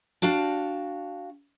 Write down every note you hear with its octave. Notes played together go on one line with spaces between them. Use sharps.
D4 F#4 F5 G5 A5